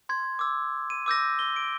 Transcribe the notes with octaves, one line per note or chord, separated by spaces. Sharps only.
C6 G#6
D6 E6
D#7
D6 E6 G6 A#6
G7
D7